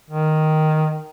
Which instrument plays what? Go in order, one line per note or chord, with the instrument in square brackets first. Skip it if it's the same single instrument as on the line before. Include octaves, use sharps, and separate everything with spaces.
[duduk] D#3